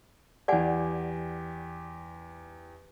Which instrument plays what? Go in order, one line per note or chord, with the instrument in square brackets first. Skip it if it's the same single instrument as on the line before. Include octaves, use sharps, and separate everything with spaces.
[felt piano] E2 G4 [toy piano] D5 F#5 G#5